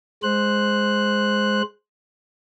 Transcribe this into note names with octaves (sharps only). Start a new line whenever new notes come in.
G#3 C5 F#6